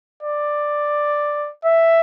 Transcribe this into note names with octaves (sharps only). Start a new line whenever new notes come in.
D5
E5